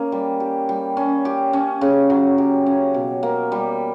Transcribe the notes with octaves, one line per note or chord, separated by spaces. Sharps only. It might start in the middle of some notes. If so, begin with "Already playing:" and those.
Already playing: A#3 C#4
G3
G4
G3
C#4
G4
C#4
C#3
F#3
G4
C#4
B2
A#3
G3